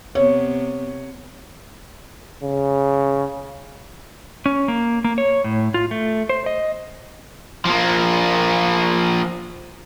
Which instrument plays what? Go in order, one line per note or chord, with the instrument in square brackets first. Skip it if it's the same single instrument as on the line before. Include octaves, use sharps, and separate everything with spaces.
[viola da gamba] C3 B3 [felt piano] C#5
[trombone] C#3
[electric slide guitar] C#4
A#3
A#3
C#5
A2
F4
A3
C5
D#5
[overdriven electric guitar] F3 A#3